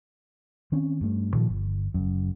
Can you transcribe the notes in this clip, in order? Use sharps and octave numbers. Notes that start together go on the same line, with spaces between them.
D#3 C4 C#4
G2 A3
A#2 D#3 F3
G1
F#1 F#2